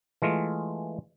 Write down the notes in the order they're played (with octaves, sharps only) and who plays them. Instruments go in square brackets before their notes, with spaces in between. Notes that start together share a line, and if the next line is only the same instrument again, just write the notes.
[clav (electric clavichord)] E3 G#3 A3 F4